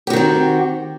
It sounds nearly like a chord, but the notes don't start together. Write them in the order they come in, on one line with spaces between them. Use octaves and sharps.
G4 F#4 D#3 C4